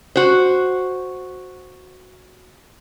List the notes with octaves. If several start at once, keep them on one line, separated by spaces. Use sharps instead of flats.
F#4 C5